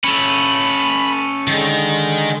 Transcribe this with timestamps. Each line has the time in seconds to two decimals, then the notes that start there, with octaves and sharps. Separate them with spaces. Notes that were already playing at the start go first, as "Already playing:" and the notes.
0.04 C#4 A4 B5
1.47 D3 D#3 G#3